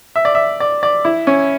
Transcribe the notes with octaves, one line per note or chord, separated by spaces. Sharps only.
E5
D5
E5
D5
D5
E4
C#4